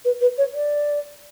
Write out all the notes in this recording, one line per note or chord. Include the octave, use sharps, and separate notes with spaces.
B4
B4
C#5
D5